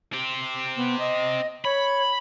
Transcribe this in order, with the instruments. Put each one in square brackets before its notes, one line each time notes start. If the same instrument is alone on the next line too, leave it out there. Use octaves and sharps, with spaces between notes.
[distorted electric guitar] C4 G4
[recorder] B3
D#5
[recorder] C#5 [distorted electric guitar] B5